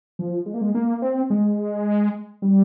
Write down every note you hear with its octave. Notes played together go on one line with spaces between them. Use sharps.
F3
G#3
A#3
G#3
A#3
C4
G#3
G3